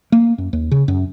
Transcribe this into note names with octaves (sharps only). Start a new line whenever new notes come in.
A#3
F#2
D#2
C#3
F#2